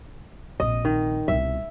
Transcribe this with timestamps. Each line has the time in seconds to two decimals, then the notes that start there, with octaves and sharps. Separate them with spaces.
0.60 A#1 C3 D#5
0.85 D#3
1.28 C2 B2 E5